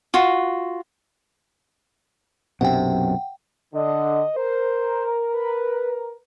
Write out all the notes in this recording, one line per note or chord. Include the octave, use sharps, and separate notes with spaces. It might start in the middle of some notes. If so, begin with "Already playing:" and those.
F4 F#4
B1 F#2 C3 F#5 G5
D3 D#5
A#4 C5
B4